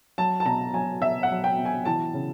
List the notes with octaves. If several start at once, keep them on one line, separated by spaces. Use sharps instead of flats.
F#3 A5
A5
B2 A#5
F#3 G#5
B2 E5
F#5
F#3
G5
B2
G#5
E3 A5
C#3